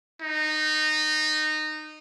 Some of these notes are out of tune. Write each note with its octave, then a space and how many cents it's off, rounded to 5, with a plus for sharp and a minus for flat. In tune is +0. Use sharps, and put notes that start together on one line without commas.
D#4 -20